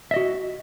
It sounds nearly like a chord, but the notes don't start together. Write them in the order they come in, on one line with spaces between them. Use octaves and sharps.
E5 D#5 F#4